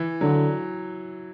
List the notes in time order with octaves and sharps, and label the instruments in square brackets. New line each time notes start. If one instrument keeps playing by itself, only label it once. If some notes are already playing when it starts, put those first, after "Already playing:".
Already playing: [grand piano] E3
[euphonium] D3 [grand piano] F#3